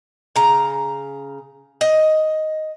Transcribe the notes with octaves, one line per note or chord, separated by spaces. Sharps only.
C#3 A#5
D#5